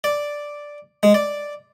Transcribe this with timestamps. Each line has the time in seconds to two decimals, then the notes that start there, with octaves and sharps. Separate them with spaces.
0.04 D5
1.03 G#3
1.14 D5